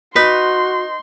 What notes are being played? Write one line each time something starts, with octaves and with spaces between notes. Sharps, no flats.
D#4 F#4 B4 C6